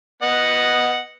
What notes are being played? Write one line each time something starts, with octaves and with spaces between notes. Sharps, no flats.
B3 D#5 F#5